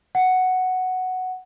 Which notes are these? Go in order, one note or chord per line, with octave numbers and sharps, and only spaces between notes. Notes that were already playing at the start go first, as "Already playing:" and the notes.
F#5